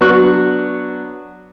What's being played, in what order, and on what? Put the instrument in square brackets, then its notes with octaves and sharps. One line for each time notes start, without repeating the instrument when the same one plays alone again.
[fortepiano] F#3 B3 D4 F#4 C#6 F#6